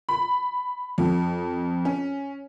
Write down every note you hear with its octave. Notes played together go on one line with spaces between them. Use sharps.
B5
F2
C#4